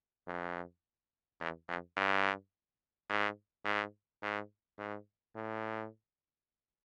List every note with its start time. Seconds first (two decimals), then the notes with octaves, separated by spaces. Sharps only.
0.27 F2
1.41 E2
1.68 F2
1.97 G2
3.10 G#2
3.65 G#2
4.22 G#2
4.79 G#2
5.35 A2